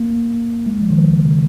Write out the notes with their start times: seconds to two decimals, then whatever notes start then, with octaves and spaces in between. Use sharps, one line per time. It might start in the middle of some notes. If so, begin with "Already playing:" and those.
Already playing: A#3
0.66 G#3
0.82 F3
0.90 D#3
0.96 F3
1.11 C#3
1.26 C#3